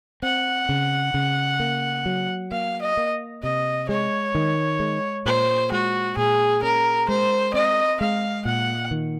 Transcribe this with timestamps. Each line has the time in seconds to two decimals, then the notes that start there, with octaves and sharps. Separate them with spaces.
0.22 C4 F#5
0.69 C#3
1.14 C#3
1.60 A#3
2.06 F#3
2.51 A#3 F5
2.82 D#5
2.97 A#3
3.43 C3 D#5
3.89 G#3 C#5
4.35 D#3
4.80 G#3
5.26 A#2 C5
5.72 G#3 F#4
6.17 A#2 G#4
6.62 C#4 A#4
7.08 G#3 C5
7.54 C4 D#5
8.01 G#3 F5
8.45 A#2 F#5
8.91 D#3